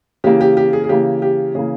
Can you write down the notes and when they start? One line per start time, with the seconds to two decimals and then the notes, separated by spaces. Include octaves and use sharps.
0.24 C#3 E3 A#3 G4
0.41 G4
0.57 G4
0.73 G#4
0.84 G#4
0.89 C#3 E3 A#3 G4
1.22 G4
1.55 C#3 E3 A#3 G#4